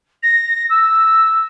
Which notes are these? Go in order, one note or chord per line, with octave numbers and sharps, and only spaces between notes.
A#6
E6